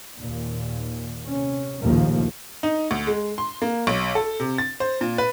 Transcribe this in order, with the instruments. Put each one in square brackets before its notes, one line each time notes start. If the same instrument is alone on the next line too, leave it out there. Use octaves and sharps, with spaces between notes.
[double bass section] D#2 A#2
C3 C#4
A#1 D#2 A2 C#3 F3 A#3
[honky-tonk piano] D#4
D2
G#3
C6
A#3
B1
A4
C3
A6
C5
A#2
B4